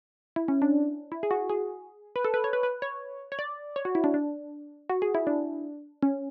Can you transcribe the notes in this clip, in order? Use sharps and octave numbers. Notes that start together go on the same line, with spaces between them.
E4
C#4
D4
E4
G#4
F#4
G#4
B4
A4
B4
C#5
B4
B4
C#5
C#5
D5
C#5
F#4
E4
D4
D4
F#4
G#4
E4
D4
C#4